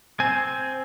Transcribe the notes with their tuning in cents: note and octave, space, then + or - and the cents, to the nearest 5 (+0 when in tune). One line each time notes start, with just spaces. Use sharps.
C4 +0 G#5 +10